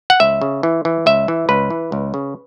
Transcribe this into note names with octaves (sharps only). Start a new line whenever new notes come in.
F#5
C#2 E5
C#3
E3
E3
C#2 E5
E3
C#2 B4
E3
C#2
C#3